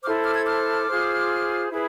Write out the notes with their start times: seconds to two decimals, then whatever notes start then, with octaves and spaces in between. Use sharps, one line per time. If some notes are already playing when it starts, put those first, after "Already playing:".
0.03 C5 D6 F6
0.06 E4 A4
0.25 D6 F6
0.35 E6 G#6
0.45 D6 F6
0.87 F4 G#4 C5
1.71 E4 G#4 B4